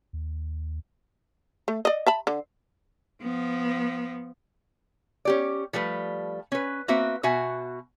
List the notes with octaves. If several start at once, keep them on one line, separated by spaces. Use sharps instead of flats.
D#2
A3
D5 D#5
E5 A5 B5
D3
F3 B3
C#4 G4 D5
F3 G3 A3 B4
C#4 B4
A#3 C4 F#4 B4 E5
B2 F#4 E5 G#5